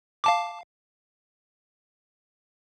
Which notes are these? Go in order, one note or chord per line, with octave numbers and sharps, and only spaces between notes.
F5 A5 D6